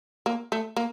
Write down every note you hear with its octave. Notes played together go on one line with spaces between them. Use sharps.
A#3
A3
A#3